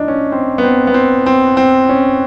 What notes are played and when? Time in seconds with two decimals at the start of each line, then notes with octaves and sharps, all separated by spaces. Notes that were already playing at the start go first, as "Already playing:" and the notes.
Already playing: A2 F3 D4 D#4
0.08 C#4
0.32 C4
0.58 B3
0.64 C4
0.87 B3
0.94 C4
1.26 C4
1.57 C4
1.89 C#4